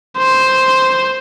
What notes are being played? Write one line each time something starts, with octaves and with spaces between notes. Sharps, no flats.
C5